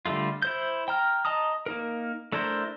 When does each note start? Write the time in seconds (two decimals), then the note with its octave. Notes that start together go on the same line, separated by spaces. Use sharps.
0.06 D3 G3 A3 F4
0.42 E4 C5 G6
0.88 G5 A#5 F6
1.25 D#5 A5 A#5 D#6
1.66 A#3 D#4 A#4
2.32 A3 D4 E4 A#4 C5